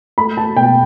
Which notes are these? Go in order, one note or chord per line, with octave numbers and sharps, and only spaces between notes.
A3 B5
A5
B2 G5